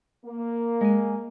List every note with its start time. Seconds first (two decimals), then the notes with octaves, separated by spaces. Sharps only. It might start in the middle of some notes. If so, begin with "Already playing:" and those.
0.25 A#3
0.81 G#3 G#5